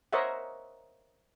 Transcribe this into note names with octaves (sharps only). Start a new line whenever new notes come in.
A#4 C5 C#5 D#5 E5 F#5